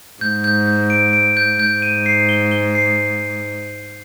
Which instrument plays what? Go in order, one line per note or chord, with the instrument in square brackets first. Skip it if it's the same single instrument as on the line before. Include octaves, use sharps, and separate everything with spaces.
[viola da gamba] G#2 [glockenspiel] G6
[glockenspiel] G6
G6
D7
D7
G6
[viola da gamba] G#2 [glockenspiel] G6
[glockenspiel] D#7
C7
G7
G7
C7